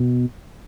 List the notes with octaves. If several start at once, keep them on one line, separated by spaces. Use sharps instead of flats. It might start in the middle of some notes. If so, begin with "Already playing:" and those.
Already playing: B2